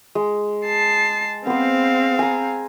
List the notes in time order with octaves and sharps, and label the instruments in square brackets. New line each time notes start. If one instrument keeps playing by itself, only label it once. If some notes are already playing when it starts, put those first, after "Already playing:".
[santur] G#3
[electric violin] A5 C7
[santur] B3 C5 [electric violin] C4 F5
[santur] G#5 A#5